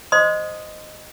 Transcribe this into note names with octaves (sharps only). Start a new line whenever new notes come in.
C5 D#5 C6 D#6